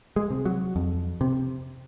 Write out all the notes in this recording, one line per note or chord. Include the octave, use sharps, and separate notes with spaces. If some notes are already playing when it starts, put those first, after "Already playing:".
G#3
C3
F#3
F2
C3